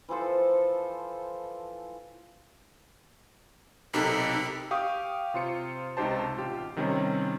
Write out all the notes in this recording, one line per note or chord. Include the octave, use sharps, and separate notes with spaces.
E3 F3 A4 C5
B1 C3 D#4 G4 A4 A#4 B5
G4 F5 G5 C#6 D#6
C3 F4 C5 C#7
C#2 C3 D#4 G4 C5 A5
A1 F4 G4
C3 D#3 G3 C4 C#4